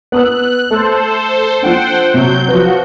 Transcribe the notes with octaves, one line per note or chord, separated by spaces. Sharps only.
B3 D#6 E6 F#6
A3 A4 C5
F3 D4 C5 F#5 G5
C3 F#3 G6
F3 F#4 B4